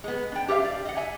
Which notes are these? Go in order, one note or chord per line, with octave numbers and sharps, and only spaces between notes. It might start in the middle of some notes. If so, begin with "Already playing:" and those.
G#3 B3
D4 G5
G4 A4 B4 E5 F5
D5
D#5 F#5
E5 G#5